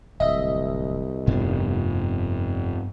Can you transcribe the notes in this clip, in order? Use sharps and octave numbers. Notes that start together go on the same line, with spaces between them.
D1 C2 D#5 E5
F1 G2 B3 D4